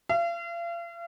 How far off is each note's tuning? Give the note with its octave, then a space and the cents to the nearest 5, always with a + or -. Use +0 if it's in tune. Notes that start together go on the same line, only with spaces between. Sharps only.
F5 -40